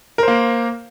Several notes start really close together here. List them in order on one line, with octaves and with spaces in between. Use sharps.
A#4 C5 A#3